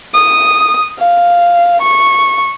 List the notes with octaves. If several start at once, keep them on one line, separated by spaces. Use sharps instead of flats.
D#6
F5
C#6